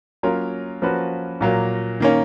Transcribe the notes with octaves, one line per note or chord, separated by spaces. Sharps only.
F#3 A#3 C#4 F4 A#4
F3 A#3 C#4 F#4 B4
A#2 F#3 A#3
D#3 A#3 C#4